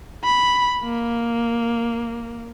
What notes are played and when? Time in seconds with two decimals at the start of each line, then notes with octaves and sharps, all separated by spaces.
0.24 B5
0.85 A#3